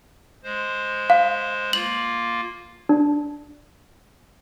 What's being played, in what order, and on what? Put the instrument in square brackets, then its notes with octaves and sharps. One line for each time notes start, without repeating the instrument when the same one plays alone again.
[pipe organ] G#3 C5
[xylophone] F5
[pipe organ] A#3 F4 [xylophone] F#7
[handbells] D4